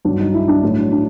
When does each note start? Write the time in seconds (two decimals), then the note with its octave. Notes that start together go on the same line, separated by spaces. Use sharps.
0.05 G2 D#3 F#3 D4
0.19 D#4
0.34 E4
0.48 D4
0.63 A2 F#3
0.92 D4